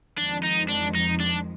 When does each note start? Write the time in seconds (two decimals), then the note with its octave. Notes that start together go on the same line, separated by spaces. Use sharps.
0.18 F2 D#3 G#3 D4
0.43 D#4
0.69 D4
0.95 D#4
1.20 D4